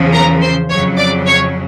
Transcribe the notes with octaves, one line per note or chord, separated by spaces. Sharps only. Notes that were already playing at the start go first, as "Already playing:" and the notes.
Already playing: E2 C#3 F3
A#4 A#5
C5 C6
F2 C#3 F#3 C#5 C#6
D5 D6
C#5 C#6